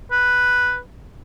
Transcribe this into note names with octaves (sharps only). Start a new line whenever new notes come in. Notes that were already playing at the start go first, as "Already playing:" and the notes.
B4